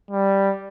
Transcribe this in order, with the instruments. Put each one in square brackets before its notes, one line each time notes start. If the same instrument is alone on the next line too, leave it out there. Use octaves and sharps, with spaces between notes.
[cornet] G3